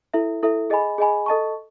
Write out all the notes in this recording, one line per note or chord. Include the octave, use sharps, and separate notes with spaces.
E4 A4 E5
E4 A4 E5
G#4 D#5 G#5 B5
G#4 D#5 G#5 B5
A4 D#5 A5 C#6